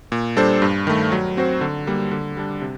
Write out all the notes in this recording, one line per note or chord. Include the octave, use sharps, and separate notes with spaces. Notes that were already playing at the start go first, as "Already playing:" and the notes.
A#2
G3 D4 A4 C5
G2
D#3 A3
F#3
C4 F#4 C5
D3
G3 A#3
D3
G3 D4
C3